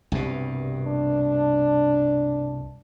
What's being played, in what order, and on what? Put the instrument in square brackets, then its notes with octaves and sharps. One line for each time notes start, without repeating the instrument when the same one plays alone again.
[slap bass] C2 G2 B2
[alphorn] D4